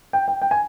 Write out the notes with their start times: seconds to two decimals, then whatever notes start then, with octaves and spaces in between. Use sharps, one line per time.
0.13 G5
0.28 G5
0.42 G5
0.51 G#5